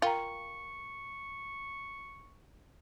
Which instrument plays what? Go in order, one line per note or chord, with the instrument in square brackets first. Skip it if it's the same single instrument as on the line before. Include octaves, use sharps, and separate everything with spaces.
[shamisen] F4 [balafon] A#4 G5 A#5 [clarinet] C#6